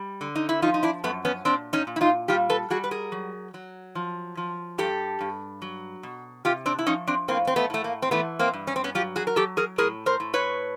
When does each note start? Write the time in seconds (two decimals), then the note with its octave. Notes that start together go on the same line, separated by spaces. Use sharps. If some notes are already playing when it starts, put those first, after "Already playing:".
Already playing: G3
0.21 D3
0.36 D#4
0.49 E4
0.62 F3 D#4 F4
0.74 D#4
0.83 D4 E4
1.04 F#2 A3 B3
1.25 B3 C#4
1.45 A#2 C4 D4
1.73 C#4 D#4
1.87 A#2
1.96 E4
2.01 D#4 F4
2.28 G3 F4 G4
2.50 A4 B4
2.70 G3 F#4 G#4
2.84 B4
2.91 G#4 A#4
3.12 F#3
3.54 F#3
3.95 F3
4.37 F3
4.78 G2 G4 A4
5.21 G2
5.62 F#3
6.03 B2
6.45 C3 F4 G4
6.66 C4 D4
6.79 E4
6.87 F3 C#4 D#4
7.08 C4 D4
7.28 A2 A#3 C4
7.47 C4
7.56 A3 B3
7.70 A2 A3
7.84 A#3
8.02 C4
8.11 E3 A3 B3
8.39 A#3 C4
8.53 G2
8.67 C#4
8.76 C4
8.84 B3 C#4
8.95 F#3 F4 G4
9.16 F#4 G#4
9.27 A#4
9.36 F#3 G4 A4
9.57 G#4 A#4
9.78 A2 G#4 A#4
10.06 A#4 C5
10.20 A2
10.34 B4 C#5